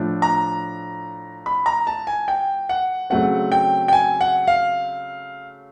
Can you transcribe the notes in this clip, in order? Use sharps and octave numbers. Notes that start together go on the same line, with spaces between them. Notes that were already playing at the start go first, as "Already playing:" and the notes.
Already playing: A2 F3 A3 D4
A#5
B5
A#5
A5
G#5
G5
F#5
C#3 F#3 A3 C4 F#5
G5
G5
G#5
F#5
F5